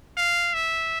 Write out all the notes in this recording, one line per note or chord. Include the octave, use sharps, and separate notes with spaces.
F5
E5